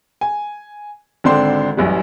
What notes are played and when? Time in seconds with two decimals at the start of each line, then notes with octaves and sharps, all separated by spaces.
0.21 G#5
1.24 G#1 D3 C4 D4 C6
1.77 A1 F#2 E3 G3